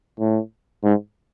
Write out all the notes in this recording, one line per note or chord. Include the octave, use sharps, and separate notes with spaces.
A2
G#2